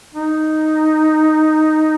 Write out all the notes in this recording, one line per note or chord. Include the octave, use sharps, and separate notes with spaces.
D#4